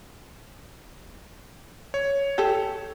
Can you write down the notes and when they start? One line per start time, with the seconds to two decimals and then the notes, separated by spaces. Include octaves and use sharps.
1.94 C#5
2.38 G4 A4